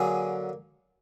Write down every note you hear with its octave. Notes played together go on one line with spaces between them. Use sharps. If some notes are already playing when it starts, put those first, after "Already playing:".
Already playing: D3 F#3 A#3 G#4